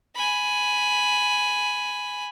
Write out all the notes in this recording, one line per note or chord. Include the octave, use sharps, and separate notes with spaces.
G#5 B5